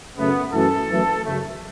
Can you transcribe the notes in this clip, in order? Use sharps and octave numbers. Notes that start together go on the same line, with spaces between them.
F#2 C#3 A3 B3
F#2 E3 A3 A4
F#2 E3 A3
F#2 C#3 A3